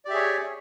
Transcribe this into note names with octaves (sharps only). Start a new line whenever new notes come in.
G4 G#4 C#5 D5 E5